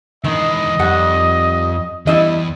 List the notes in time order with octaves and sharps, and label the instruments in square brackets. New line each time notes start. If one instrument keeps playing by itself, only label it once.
[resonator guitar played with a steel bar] D#3 [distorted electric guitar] E3 G#3 [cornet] D#5
[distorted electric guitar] F2 [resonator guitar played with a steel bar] D#3 G3 F#5
[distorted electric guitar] E2 E3 [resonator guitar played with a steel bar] G3 E4 D#5